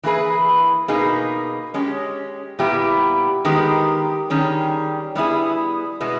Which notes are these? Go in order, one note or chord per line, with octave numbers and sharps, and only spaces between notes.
E3 A#3 E4 G#4 B4
B2 A#3 D#4 G#4 B4
G#3 C#4 G4
A#2 G3 B3 E4 G4
D#3 G#3 B3 G4 A#4
D#3 G3 C#4 G#4
G3 B3 E4 G#4
B2 G#3 B3 E4